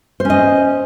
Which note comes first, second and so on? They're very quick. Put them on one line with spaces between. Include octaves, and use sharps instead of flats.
C5 C#4 D#5